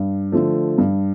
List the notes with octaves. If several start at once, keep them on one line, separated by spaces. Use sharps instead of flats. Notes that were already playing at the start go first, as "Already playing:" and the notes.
Already playing: G2
D3 F3 A3
G2